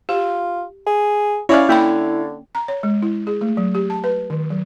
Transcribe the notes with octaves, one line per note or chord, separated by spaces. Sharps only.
F4 G4
G#4
C#4 E4 C#5 D5 F5 G#5
D3 A#3 E4 G5 B5
A#5
C#5
G#3
E4
G#4
A3
F#3
G4
A5
B4
D#3
F#3